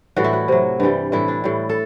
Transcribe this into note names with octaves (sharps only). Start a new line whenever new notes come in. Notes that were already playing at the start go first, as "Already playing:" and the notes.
A2 E3 G3 F#4
E4
F#4
C3 F#3
G2 E3 G3
A2 E3 G3 E4
D4
A2 G3
A4